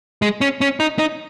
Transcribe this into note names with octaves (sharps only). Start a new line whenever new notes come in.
G#3
C#4
C#4
D#4
D#4